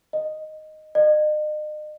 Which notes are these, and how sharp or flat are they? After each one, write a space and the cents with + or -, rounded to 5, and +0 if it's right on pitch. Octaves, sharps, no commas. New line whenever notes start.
D#5 -5
D#5 -40